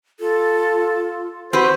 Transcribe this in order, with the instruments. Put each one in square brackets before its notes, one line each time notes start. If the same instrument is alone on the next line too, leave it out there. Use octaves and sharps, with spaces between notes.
[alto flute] F4 [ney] A4
[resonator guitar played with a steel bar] C4 G4 B4 [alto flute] F#4 [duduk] C5 [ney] F#5